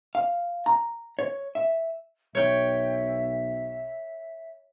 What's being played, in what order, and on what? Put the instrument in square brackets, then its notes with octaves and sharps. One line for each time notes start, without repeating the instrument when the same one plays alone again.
[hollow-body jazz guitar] F5
A#5
C#5
E5
[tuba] B1 [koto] C#5 G5 [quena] E5